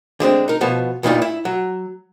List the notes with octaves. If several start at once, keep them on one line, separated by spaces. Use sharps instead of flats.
D3 G#3 C4 D4
D#4 A#4
B2 F3 B3 A5
E2 G2 A#2 D#4 F4 D5
E4
F#3